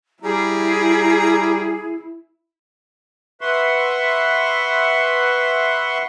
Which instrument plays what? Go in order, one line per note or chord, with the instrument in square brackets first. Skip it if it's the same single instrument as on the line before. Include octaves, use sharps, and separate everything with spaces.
[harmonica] G3 A#5 [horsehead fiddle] E4 [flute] G#4
[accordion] B4 E5 F#5 C6 C#6